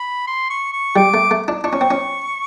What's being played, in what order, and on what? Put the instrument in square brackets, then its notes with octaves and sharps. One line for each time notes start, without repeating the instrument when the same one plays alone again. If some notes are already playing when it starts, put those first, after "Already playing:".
Already playing: [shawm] B5
C6
C#6
C#6
[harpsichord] G3 [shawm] D6
[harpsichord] A3
A3
D4
[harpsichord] D4 [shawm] C#6
[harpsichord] C#4
C4
C#4